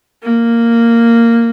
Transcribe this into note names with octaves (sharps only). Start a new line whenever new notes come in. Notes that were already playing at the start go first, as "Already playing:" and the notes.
A#3